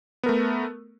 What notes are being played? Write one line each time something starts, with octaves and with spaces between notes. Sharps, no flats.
A3 B3 A#4